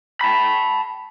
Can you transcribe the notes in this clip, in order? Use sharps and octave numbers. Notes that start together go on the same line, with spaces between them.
A5 B5